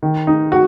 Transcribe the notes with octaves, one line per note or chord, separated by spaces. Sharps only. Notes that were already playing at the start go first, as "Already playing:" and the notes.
D#3
D#4
F#4